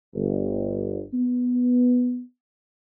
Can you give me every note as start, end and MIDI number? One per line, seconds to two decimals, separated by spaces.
0.14 1.01 31
1.13 2.20 59